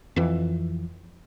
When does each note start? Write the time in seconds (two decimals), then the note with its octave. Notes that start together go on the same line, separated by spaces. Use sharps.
0.16 F2 E3